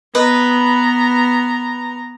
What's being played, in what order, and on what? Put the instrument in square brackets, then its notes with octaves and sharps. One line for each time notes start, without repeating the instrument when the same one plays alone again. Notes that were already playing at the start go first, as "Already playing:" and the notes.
[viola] B3 A#5 [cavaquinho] B4 D#5